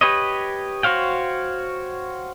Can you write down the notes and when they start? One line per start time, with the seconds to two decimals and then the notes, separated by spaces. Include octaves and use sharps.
0.01 G4 B4 C#5 D#5
0.83 F#4 C5 C#5 F5 G5